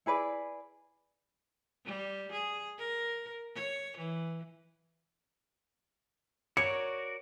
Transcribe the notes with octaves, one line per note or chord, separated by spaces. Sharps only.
E4 G#4 B4 D5
G3
G#4
A#4
C#5
E3
F#4 A#4 C#5 D5 C#7